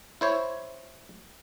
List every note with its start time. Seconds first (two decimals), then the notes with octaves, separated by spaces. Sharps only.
0.21 E4 C5 C#5